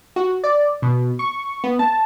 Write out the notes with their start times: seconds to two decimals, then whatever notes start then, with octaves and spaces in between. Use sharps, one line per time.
0.16 F#4
0.44 D5
0.82 B2
1.19 C#6
1.64 B3
1.79 A5